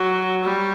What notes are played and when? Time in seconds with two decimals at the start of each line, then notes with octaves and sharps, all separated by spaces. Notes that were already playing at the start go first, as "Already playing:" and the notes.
Already playing: F#3
0.44 G3